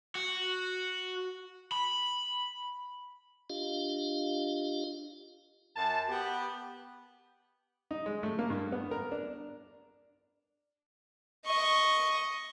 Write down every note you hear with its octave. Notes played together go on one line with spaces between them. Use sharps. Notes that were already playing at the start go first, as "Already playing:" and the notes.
F#4
B5
D4 F4 G4 D#5 F5
F#2 A5
B3 G4
D#4
G#3
A3
A#3
G2
B3
A#4
D4
D#5 C#6